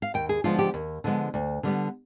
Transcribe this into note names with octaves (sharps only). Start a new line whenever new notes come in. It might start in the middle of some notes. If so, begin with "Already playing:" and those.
F5
D#2 G5
G#4
D3 F3 G#3 B3 F4
G4
D#2
D3 F3 G#3 B3
D2
D3 G3 B3